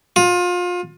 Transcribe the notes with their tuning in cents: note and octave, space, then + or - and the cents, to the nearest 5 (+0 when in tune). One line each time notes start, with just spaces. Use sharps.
F4 +30